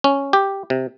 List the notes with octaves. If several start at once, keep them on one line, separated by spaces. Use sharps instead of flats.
C#4
G4
C3